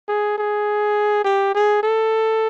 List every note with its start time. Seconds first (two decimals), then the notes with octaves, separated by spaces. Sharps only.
0.08 G#4
0.38 G#4
1.25 G4
1.55 G#4
1.83 A4